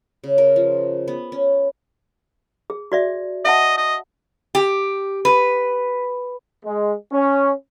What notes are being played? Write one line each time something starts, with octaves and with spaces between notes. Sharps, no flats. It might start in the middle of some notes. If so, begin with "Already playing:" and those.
C#3
A#4
F3
B3
C#4
G#4
F#4 D5 E5
D#5 E5 F#5 A5
D#5
G4
B4
G#3
C#4